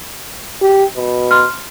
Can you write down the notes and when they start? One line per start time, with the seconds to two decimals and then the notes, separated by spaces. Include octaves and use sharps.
0.61 G4
0.96 B2
1.31 C6 F6